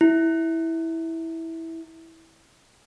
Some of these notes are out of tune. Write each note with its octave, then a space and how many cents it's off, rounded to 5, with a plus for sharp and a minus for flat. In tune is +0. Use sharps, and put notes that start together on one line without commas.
E4 -10